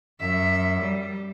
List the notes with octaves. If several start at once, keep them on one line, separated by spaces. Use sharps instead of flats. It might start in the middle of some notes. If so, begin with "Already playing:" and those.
F#2 E5
G3